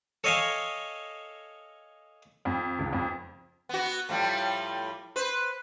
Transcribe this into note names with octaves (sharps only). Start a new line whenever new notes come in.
A4 C#5 D#5 F5 G#5 A5
F2
C#2
F2
B3 F#4
A2 F3 G3
B4 C5